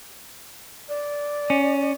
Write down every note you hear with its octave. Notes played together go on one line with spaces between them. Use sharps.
D5
C#4